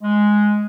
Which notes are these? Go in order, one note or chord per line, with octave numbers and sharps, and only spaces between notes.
G#3